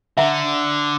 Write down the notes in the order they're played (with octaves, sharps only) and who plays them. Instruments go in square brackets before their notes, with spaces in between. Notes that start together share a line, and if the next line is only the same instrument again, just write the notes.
[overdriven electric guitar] D3 [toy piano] E5 F#5 A#5